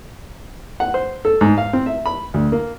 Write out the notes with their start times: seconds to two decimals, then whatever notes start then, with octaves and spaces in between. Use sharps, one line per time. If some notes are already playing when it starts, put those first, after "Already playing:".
0.80 F#5
0.94 C5
1.25 A4
1.41 G#2
1.58 F5
1.73 C4
1.86 E5
2.06 B5
2.34 D2
2.52 A#3